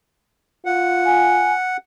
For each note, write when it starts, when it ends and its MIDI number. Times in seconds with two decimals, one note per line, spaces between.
0.66 1.56 65
0.66 1.77 78
1.06 1.53 80